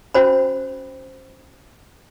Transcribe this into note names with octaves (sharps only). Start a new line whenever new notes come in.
C#4 F#4 C5 B5